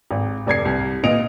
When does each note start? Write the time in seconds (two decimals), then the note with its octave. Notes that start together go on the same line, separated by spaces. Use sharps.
0.11 G#1
0.46 F1 D5 G#6 C7
0.65 C2
1.04 A#2 D#5 D7 F7